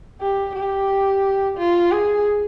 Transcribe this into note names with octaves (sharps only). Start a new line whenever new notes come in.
G4
G4
F4
G#4